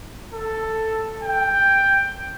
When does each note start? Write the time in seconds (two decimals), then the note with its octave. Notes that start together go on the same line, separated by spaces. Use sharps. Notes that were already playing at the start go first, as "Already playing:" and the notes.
0.33 A4
1.23 G5